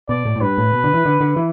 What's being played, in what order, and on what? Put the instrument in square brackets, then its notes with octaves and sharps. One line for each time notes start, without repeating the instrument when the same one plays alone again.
[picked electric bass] B2 [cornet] D5
[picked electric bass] A2
A2
[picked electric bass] G2 [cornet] B4
[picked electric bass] A2
B2
D3
E3
D3
D3
E3